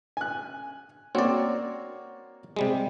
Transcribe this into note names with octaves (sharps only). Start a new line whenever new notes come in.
G#5 F#6
A#3 C4 F#4 C#5 D5
C3 G3 G#3